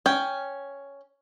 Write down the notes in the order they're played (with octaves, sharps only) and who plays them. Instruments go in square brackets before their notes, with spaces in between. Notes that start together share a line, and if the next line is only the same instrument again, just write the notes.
[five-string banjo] C#4 G5